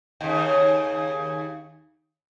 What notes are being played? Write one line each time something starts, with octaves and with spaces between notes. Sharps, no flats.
D#2 C#3